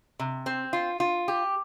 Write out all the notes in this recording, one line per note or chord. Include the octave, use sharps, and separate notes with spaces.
C3
C4
F4
F4
G4